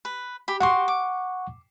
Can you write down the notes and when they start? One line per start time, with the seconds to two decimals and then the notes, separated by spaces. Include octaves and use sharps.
0.05 B4
0.48 G4 B5
0.60 F#4 G4 F#5 C6 C#6
0.88 D6